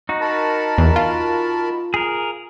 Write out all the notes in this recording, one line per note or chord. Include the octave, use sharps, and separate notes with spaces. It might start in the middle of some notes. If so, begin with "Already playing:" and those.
D#4 F#4
A#4 A5 B5
E2
F4
G#4 A#4